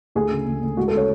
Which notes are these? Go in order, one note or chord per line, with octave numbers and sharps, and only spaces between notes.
D2 G#4
C#3
D2
D2
G#3 F#4
A4
C#3 C#5